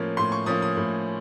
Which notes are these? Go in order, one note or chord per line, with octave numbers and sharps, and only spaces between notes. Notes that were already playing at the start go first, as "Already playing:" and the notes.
Already playing: A2 F3 A#3 C#4
A2 C6
C#6
F3 A#3 C#4 D#6
D#6
A2